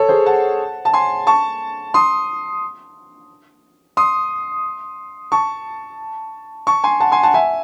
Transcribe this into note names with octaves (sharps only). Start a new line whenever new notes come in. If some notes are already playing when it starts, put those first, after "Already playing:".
Already playing: A4 C#5
G#4 C5
F#5 A5
A5
G#5 C6
A5 C#6
C6 D#6
C6 D#6
A5 C#6
A5 C#6
G#5 C6
F#5 A5
G#5 C6
F#5 A5
E5 G#5